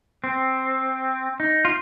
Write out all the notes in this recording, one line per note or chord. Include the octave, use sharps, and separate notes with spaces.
C4
D#4
F4